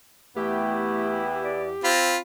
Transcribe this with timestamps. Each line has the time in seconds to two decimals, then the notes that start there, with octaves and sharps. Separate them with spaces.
0.36 E2 A3 B3 E4 G4
1.43 D5
1.84 C4 F4 B5